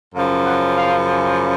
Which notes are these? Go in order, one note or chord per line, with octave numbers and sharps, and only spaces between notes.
F#2 C#3 F3 F5
F#5
F5